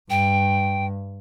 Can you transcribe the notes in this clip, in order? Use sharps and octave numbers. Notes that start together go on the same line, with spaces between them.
G2 G5